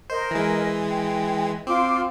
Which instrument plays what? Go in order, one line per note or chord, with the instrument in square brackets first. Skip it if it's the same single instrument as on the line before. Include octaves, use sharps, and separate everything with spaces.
[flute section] A#4 D#5 [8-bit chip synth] C5
[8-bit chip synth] E3 G#3
[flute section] G5
[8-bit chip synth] C4 [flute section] F4 C6 D6